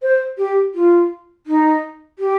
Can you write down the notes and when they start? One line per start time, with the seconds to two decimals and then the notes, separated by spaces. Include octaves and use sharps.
0.02 C5
0.38 G4
0.75 F4
1.47 D#4
2.19 G4